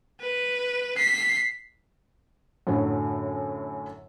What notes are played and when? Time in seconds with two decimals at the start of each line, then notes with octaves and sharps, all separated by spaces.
0.21 B4
0.97 B6 C7
2.67 F#2 A2 D3 F#3